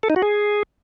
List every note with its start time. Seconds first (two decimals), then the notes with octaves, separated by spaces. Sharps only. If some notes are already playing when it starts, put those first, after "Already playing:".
0.03 A4
0.10 D#4
0.16 F#4
0.22 G#4